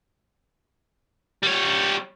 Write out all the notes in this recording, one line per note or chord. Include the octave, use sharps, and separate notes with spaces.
G3 C#5